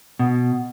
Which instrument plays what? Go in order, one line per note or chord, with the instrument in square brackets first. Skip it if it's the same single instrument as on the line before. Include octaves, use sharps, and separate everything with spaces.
[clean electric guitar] B2